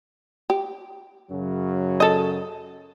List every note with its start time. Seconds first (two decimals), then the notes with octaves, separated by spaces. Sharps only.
0.50 G4
1.31 F#2 C#3 F#3
2.00 A4 D#5